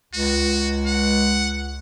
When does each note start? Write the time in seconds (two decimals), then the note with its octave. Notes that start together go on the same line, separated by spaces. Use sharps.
0.14 C#2 F#4
0.86 F#5